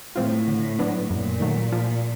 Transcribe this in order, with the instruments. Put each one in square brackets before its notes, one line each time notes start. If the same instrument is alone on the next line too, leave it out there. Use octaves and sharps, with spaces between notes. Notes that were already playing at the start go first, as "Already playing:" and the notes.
[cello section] A2 [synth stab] E3 G#3 C4 F4
[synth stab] D3
F#3 B3 D4
[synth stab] F#2 [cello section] A#2
[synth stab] D#3 F#3 A3
F3